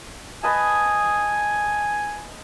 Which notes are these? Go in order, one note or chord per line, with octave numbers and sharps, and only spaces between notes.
B4 D#5 G#5 A5